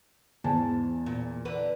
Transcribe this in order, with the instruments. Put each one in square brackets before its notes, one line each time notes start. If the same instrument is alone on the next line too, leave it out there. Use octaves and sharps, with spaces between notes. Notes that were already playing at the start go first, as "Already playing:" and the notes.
[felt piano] E2 G#5 A5 [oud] G#2
[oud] A#2
E2 D3 B4